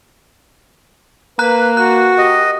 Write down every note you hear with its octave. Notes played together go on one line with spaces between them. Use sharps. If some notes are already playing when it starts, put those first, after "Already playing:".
A#3 B4 A#5 F#6
F#4 F#6
G4 D#5